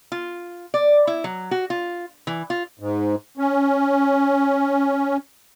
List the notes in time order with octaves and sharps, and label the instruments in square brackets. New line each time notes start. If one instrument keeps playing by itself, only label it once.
[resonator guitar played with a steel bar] F4
D5
E4
F#3
F#4
F4
E3
F4
[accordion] G#2
C#4